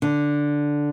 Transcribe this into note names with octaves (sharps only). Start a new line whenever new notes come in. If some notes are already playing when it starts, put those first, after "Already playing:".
D3